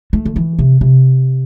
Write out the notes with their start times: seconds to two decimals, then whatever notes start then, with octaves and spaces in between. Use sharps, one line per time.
0.13 A3
0.25 D3
0.36 E3
0.59 C3
0.81 C3